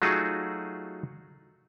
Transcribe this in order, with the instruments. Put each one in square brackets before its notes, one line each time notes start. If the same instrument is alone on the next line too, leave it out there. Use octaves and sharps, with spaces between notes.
[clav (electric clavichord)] F#3 A3 D#4 F4 F#4 G#4